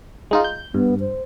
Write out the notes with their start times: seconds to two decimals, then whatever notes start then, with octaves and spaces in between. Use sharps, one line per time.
0.31 G#3 D#4 F4
0.44 G6
0.74 G2 B3
1.00 C5